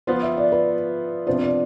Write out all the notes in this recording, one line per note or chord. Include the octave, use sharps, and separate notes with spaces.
F3 B3 F4 C5
E5
D5
B4
C3 F3 B3 D4 F4 C5
D5